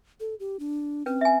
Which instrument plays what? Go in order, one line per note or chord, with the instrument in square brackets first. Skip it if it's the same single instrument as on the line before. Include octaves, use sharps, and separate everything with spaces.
[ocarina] A4
G4
D4
[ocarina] C4 [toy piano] C#4 B4
[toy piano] E5 G#5